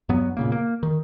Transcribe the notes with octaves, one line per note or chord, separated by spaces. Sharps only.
G2 F#3 B3
A#2 C#3 A#3
A#3
D#3